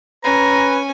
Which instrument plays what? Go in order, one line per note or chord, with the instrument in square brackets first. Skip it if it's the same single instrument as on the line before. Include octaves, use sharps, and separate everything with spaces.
[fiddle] C#4 G#5 [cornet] B4 [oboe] A#5